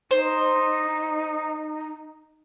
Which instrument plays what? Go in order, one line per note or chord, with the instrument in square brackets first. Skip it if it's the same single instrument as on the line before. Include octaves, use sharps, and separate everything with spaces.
[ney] D#4 [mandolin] C5